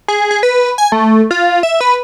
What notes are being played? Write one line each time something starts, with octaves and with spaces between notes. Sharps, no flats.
G#4
G#4
B4
G#5
A3
F4
E5
B4